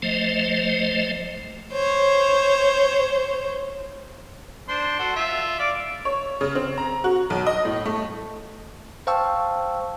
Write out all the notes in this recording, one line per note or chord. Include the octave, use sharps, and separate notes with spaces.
F3 A3 C5 D#5
C5 C#5
D4 C5 C6
F#4 A4 C6
F4 E5
D5 F5 D6
C#5
C#3
C4
A#5
F#4
B1
D#5
A2
A3
C5 F5 G5 A5 C#6 E6